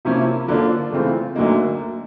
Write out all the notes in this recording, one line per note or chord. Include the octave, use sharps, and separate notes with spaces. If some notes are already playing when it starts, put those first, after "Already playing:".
C3 F3 A#3 C#4 E4
D3 F3 A#3 D4 F4
C#3 E3 A3 C4 F4
D2 D3 F#3 A#3 D#4